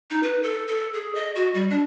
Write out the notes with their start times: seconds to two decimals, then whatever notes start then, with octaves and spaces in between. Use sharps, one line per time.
0.10 D#4
0.23 B4
0.43 A4
0.68 A4
0.94 G#4
1.15 D#5
1.35 F#4
1.54 G3
1.70 D4